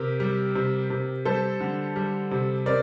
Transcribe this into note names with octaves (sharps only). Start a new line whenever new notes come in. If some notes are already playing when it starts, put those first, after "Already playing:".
Already playing: C3 G4 A#4
G3
C3
C3
G3 A4 C5
D3
G3
C3
C4 A#4 D5